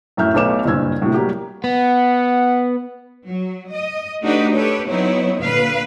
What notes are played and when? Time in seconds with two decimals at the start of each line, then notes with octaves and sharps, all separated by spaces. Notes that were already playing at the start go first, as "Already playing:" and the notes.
0.17 F#2 A2 E5 F6 G6
0.34 B1 A3 B4 C#5 D6 E7
0.65 F#1 G2 A#2 E6 G#6
1.02 A2 C3
1.14 F#3 G3 A#3 F#4 G4
1.64 B3 F#5
3.26 F#3
3.71 D#5
4.23 A3 D4 D#4 F#4 G4 B4
4.54 G4 A4 B4 C#5
4.88 F#3 B3 C4 D#4 E4 C#5
5.41 A#2 D3 B4 F5